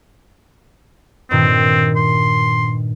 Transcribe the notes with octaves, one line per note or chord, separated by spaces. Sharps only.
G2 A#2 D#3 C4
C6